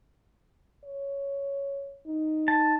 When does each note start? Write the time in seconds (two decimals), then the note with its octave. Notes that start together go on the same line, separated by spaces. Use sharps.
0.84 C#5
2.07 D#4
2.48 A5